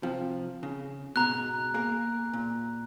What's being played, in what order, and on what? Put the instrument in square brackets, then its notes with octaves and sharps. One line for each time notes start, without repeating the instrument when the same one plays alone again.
[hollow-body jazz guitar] C3 F3
C#3
[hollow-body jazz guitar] G#2 B2 [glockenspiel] A#5 F#6
[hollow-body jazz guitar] A#3 G#4 A#4
A#2